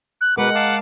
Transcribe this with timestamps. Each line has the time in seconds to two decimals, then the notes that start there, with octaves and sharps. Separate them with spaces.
0.21 F#6
0.37 B2 G#3 A#4 B4 F#5 D6
0.55 F5 A5 D6